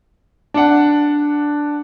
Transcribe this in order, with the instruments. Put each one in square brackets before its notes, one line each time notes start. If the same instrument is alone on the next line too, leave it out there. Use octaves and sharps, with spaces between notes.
[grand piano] D4 F#5